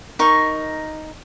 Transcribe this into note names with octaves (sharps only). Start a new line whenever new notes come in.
D#4 A#4 C#6